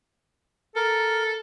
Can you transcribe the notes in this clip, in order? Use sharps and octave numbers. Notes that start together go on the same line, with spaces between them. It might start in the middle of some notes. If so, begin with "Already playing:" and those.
A4 A#4